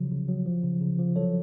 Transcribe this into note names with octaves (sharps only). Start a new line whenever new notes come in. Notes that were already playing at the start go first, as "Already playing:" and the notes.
Already playing: C#3 F3 F#3
C#3
F#3
F3
C#3
C#3
F3
F#3 A4 C#5